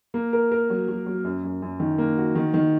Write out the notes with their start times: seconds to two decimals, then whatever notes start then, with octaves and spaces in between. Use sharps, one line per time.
0.14 A#3
0.33 A#4
0.52 A#4
0.70 F#3
0.88 F#3
1.06 F#3
1.24 F#2
1.44 F#2
1.62 F#2
1.80 D#3
1.98 A#3
2.17 F#4
2.35 D#3
2.54 D#3